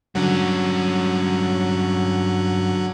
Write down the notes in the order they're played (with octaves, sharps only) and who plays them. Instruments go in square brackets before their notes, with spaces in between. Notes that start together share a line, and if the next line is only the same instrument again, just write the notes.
[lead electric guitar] G2 C#4 [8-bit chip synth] D3 F#3 F#4